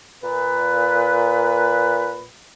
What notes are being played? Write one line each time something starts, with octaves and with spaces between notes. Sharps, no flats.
A#2 B4